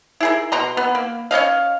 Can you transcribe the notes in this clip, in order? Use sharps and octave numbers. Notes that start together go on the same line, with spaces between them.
E4 G#4 A#4
B2 A#5 C6
B3
A#3
C#4 C#5 D#5 F5